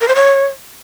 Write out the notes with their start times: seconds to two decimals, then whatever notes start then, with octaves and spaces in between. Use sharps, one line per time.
0.01 A#4
0.08 C5
0.16 C#5